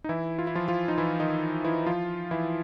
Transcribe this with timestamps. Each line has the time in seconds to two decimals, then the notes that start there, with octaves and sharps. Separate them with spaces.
0.04 D#4
0.09 E3 E4
0.39 F4
0.47 E4
0.55 F3 F4
0.68 F3 F4
0.88 D#4
0.98 E3 E4
1.20 D#3 D#4
1.64 E3 E4
1.86 F3 F4
2.31 E3 E4